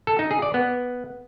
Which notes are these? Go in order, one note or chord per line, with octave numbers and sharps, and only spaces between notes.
A4
D#4
G#4
D5
B3